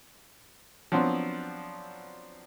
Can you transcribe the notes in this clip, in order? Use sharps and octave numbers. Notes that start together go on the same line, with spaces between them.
F3 F#3 B3 C4 D4